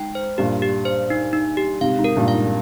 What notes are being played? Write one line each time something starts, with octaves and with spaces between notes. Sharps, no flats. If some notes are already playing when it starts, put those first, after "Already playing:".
Already playing: G#2 G5
C5
G2 A#2 G4
G4
C5
D#4
D#4
G4
G#2 C3 F5
G#2
A#4
G2 A#2
F5
G#2